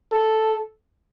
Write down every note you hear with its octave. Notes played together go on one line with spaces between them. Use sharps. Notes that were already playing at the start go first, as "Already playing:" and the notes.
A4